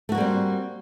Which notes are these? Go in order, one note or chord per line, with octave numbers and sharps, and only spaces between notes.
G3 A3 A#3 C4 F#4